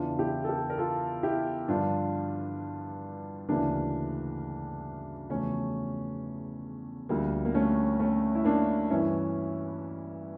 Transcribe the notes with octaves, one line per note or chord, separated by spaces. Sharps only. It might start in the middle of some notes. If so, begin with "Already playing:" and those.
Already playing: E2 C#3 E3 D4 F4
E4 G4
A4
G4 A#4
A#4
F4 A4
E4 G4
G2 D3 F3 D4 F4
D2 C#3 E3 A#3 D4
E2 C#3 F3 A3 C#4
D2 D3 F3 G3 A#3
A#3
A3 C#4
A3 C#4
E4
A#3 D4
G2 E3 C#4 E4